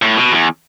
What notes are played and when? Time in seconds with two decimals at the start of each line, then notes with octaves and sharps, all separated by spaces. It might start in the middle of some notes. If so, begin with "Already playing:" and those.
0.02 A2
0.17 B2
0.32 E2